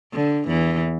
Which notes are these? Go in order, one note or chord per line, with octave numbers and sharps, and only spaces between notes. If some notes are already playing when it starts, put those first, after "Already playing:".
D3
E2 E3